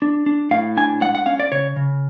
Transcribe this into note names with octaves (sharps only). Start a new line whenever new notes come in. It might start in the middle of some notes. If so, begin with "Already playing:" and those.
D4
D4
A2 F5
D4 G#5
G#3 F#5
F#5
C#4 F5
D5
C#3 C#5
C#3